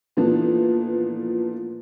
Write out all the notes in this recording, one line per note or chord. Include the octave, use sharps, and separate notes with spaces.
A#2 E3 F3 A3 B3 D4